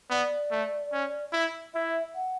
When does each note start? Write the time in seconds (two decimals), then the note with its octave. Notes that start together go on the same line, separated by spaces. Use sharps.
0.10 B3 D5
0.51 A3
0.92 C#4
1.33 E4
1.74 E4 E5
2.15 F#5